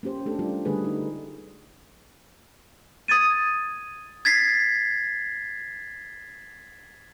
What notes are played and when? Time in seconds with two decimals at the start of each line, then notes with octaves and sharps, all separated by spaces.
0.03 A#3 C#4 G4 C5
0.26 A3 A#3 D4 G4 A4
0.39 G3 D4 F4 G4
0.65 D3 G3 A3 G#4 B4
0.84 D#4
3.08 D#6 G#6 A6 D#7
4.25 G#6 A6 B6 C7